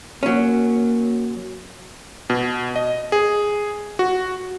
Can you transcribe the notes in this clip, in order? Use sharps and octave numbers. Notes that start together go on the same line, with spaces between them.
F#3 A#3 C#4
B2
D#5
G#4
F#4